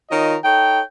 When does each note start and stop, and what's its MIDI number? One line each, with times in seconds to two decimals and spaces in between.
0.11 0.35 51
0.11 0.35 65
0.11 0.35 70
0.11 0.35 73
0.11 0.35 75
0.44 0.81 63
0.44 0.81 69
0.44 0.81 73
0.44 0.81 79